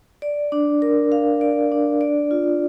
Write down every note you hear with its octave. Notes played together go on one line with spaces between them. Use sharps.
D5
D4
A#4
F5
D5
D4
D5
F4